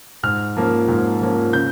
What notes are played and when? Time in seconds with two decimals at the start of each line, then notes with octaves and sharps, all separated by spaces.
0.23 G#2 F6
0.57 F3 A#3 C#4
0.88 G#2
1.21 F3 A#3 C#4
1.53 C#3 G6